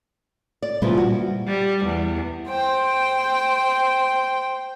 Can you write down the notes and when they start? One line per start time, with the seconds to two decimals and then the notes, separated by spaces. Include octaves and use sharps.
0.62 D5
0.82 A#2 C#3 E3 F3 G3 A#3
0.97 F#4
1.47 G3
1.85 E2
2.49 C5 G5